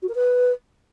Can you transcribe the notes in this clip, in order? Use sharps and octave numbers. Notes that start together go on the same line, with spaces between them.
F#4
A#4
B4